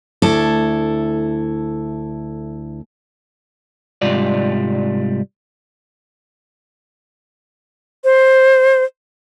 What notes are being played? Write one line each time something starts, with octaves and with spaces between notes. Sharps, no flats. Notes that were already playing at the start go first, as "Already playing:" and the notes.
D2 E4 A4
C2 G#2 G3 F4 D5
C5